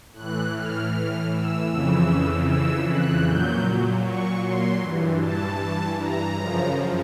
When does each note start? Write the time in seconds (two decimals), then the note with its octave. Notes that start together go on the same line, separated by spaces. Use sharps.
0.14 A2 E3 F#6
0.53 F6
1.31 E6
1.70 F2 C#3 E3
2.47 E6
2.87 F#6
3.24 A#2 F#3 G6
4.03 C#6
4.42 C6
4.80 G2 E3
5.19 A5
5.97 A#5
6.36 F#2 C#3 F3